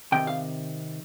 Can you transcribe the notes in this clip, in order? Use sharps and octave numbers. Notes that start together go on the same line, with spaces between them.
C3 D#3 G5
F5